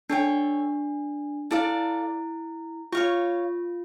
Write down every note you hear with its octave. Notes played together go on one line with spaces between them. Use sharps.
D4 A4 C#5 G5
E4 A4 D5 F5
F4 C#5 F5 C#6